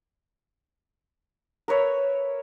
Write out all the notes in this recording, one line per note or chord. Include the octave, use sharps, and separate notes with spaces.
A#4 B4 C#5 E5